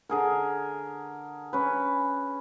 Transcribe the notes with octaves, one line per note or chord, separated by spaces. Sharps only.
D3 G#4 A#4
C#4 B4